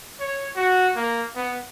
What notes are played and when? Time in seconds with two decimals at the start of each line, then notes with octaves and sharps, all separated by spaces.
0.20 C#5
0.56 F#4
0.96 A#3
1.36 B3